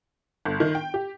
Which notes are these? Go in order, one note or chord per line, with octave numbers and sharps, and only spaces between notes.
G1
D#3
G5
G4